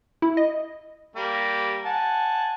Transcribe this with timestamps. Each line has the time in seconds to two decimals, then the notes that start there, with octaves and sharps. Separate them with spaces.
0.22 E4
0.37 D#5
1.16 G3 A#3 G4
1.85 F#5 G#5 A5